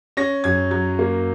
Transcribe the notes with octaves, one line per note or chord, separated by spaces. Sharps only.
C#4 A#6
F#2 G#6
F#3 G#6
A#3